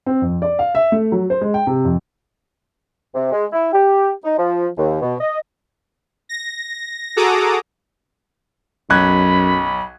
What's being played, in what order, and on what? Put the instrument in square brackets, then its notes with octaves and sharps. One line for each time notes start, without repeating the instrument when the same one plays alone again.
[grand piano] C4
F2
D5
F5
E5
A3
F#3
C5
G#3
G5
C3
F2
[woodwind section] C3
G#3
E4
G4
D#4
F3
D#2
B2
D#5
[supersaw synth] A#6
F#4 G#4 A4 A#5 D6 D#6
[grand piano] B1 F#6 G#6 [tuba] F#2 [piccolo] B5